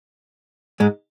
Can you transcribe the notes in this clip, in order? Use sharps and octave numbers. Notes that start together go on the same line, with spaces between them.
G#2 G#3